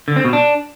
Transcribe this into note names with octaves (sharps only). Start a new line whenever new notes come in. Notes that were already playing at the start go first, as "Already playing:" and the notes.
D3
C4
B2
D4